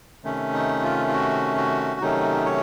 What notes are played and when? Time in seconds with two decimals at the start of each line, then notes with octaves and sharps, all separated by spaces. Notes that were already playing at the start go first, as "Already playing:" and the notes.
0.24 C3 D#3 A3 C#4
0.53 D#4
0.83 F4
1.08 F4
1.13 F#4
1.57 F#4
2.00 C3 D#3 F#3 A3 C#4 D#4
2.45 C#5